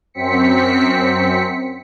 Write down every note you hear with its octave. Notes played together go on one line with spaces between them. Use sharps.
F#2 C4 B6 C#7